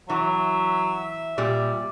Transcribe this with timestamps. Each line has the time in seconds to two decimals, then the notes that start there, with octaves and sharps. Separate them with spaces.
0.10 E3 F#3 E5
1.38 A#2 G3 D5